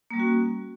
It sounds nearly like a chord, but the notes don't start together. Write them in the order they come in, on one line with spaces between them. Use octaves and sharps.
A#3 G3 C#4 F#4